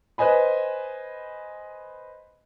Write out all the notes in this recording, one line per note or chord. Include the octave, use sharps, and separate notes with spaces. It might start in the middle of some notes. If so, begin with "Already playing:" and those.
B4 C5 D#5 G#5 B5